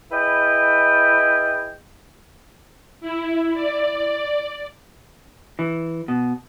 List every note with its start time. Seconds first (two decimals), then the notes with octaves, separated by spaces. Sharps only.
0.12 E4 G#4 B4 D#5 G5
3.01 E4
3.54 D5
5.59 E3
6.08 B2